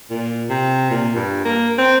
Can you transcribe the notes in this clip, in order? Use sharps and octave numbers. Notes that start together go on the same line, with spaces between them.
A#2
C3
A#2
G2
A#3
C4